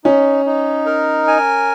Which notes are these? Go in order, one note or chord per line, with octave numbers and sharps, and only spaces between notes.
C#4 D#4
D#4
A#4
G#5